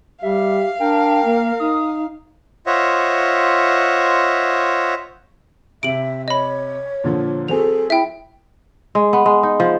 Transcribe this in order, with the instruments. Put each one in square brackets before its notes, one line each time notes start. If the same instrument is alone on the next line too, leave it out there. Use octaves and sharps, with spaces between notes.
[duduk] G3 [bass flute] G4 [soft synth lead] E5 [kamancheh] F5
[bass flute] D4 [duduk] A#4 [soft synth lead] G5
[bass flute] A#3
[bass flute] D#4 [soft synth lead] D#6
[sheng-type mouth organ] F4 C5 C#5 D#5 E5 F#5
[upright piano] C3 [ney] E5 [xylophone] D7 F#7
[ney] C#5 [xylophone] D#5 B5
[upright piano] A#2 D3 F3
[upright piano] F#3 C4 G#4 [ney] A4 [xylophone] F7
[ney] E4 [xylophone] E5 G5
[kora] G#3
B3
G#3
D#4
F3